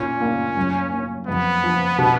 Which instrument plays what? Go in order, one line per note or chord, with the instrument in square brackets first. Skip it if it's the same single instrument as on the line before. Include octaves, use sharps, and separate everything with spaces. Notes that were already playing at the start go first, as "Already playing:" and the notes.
Already playing: [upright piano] A#2 [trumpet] C#4
[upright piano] A#3
F#2
A#3
[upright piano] F2 [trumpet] B3
[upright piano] F3
B2